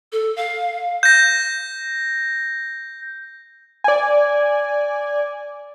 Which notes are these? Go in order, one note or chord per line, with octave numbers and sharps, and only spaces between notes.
A4
F5
G6 A#6
D5 G#5